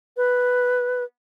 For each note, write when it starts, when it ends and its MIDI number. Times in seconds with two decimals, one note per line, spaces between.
0.17 1.04 71